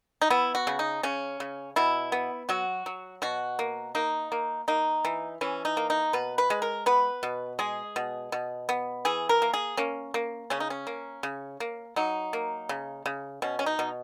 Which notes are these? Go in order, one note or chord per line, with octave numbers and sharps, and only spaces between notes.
D#4
B3 E4
F#4
C#3
D#4
C#3 C#4
C#3
B2 E4
B3
F#3 F#4
F#3
B2 F#4
A#3
A#3 D#4
A#3
A#3 D#4
E3
E3 C#4
D#4
A#3
D#4
B2 B4
B4
G#3
A#4
B3 B4
B2
G#3 G#4
B2
B2
B3
E3 G#4
A#4
A#3
G#4
A#3 C#4
A#3
C#3 C#4
D#4
C#4
A#3
C#3
A#3
F#3 D#4
A#3
C#3
C#3
B2 C#4
C#4
D#4
B2